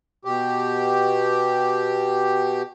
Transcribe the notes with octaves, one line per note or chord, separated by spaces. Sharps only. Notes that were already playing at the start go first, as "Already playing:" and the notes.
B2 G4